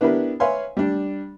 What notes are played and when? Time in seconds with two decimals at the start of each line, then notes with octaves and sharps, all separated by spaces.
0.01 B3 D4 E4 G4 A#4 B4
0.40 B4 C#5 E5 F5 G#5 C6
0.77 G3 D4